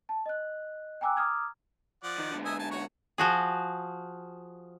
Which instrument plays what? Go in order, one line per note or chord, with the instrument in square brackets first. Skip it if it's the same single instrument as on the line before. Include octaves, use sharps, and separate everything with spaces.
[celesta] A5
D#5 F#6
G5 G#5 A#5 D6 E6 F#6
A#5 D6 D#6 F6 G#6
[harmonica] F3 D5 F#5
[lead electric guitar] D#3
G#2 D3
[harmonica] D#5 E5 G#5
G#5 A5
F#4 C#5 C#6
[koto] F3 F#4 G#4